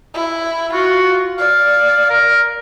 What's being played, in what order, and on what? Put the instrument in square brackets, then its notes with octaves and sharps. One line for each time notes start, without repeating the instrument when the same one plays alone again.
[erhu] E4
[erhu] F4 [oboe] F#4
[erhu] D5 [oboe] F5
[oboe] A#4